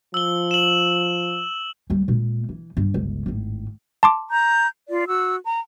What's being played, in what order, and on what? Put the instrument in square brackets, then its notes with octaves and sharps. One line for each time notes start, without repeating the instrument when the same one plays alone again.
[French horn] F3 [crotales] E6 G7
[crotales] E7 F#7
[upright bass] C#2 G3
A#2 G#3
E3
G2
G1 C#2
G#1 A2
[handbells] A5 C6 D6
[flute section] A#5 G6
F4 D5
F#4 E6
A#5